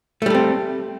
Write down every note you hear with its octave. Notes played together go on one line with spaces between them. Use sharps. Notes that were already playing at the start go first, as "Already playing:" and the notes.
G3 A3 C4 A4